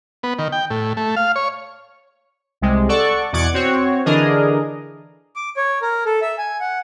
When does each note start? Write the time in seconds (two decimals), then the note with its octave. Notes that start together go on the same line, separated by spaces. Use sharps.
0.23 B3
0.39 D#3
0.52 G5
0.70 A2
0.97 A3
1.16 F5
1.36 C#5
2.61 C2 C3 G#3
2.89 A4 D5 F#5 C#6
3.33 E2 B2 D5 F#5 D6 G#6
3.54 C4 F#4 C#5
4.06 D3 E3 D4 G#4 A#4 D#5
5.36 D6
5.57 C#5
5.82 A#4
6.06 A4
6.22 E5
6.38 G#5
6.60 F#5